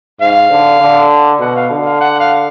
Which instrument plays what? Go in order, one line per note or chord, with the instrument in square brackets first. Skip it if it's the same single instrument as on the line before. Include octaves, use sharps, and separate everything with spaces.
[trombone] G#2 [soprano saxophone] F5
[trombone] D3
D3
[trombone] B2 [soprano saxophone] F#5
[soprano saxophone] F5
[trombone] D3
[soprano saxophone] F5
F#5
F5